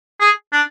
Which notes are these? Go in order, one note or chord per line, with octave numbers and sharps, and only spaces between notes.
G#4
D4